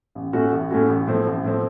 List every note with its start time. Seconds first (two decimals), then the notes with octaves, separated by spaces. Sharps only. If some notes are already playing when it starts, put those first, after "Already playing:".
0.15 A1
0.33 A2 A3 C#4 F#4
0.52 A1
0.71 A2 A3 C#4 F#4
0.89 A1
1.07 A2 F3 C4
1.26 A1
1.44 A2 F3 C4